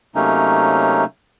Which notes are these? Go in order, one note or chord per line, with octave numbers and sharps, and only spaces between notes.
C3 F#3 A3 A#3 C#4 D#4